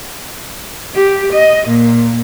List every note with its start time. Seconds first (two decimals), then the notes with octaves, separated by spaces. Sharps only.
0.95 G4
1.33 D#5
1.68 A#2